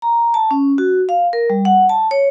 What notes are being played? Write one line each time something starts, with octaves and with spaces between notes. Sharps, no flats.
A#5
A5
C#4
F#4
F5
A#4
G3
F#5
A5
C#5